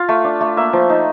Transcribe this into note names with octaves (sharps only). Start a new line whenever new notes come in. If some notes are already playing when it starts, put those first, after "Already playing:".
Already playing: F4 F5
A3
D4
A3
A#3 E5
F3
D#4